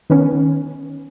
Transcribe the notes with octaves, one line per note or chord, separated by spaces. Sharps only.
D#3 B3 C#4